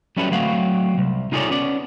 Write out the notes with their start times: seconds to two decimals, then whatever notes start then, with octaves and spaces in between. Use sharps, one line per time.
0.17 F#3 G3 C#4 E4 A4 B4
0.32 F#3 A3 C4 F#4 F5 F#5
0.98 C2
1.32 D#4 F4 G#4 A4 C#5 D5
1.50 B3 C#4 D5